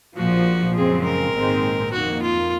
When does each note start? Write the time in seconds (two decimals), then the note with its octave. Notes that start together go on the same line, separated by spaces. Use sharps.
0.17 A#1 A#2 F3 F#4
0.75 F#2 C#3 F3 G#3 C4 G#4
1.04 A#4
1.34 A#1 G#2 D#3 G#3 C4
1.92 F2 D#3 A#3 F#4
2.22 F4